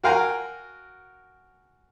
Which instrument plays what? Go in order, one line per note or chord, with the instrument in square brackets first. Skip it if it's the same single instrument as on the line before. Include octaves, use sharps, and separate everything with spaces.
[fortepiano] F#4 A#4 F5 G5 G#5 A#5